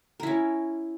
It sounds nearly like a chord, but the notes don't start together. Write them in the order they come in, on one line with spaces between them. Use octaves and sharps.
A#4 E4 C#4